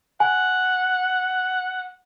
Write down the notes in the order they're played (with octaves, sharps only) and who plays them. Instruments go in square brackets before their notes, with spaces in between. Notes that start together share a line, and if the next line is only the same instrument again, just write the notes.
[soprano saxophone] F#5 [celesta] G#5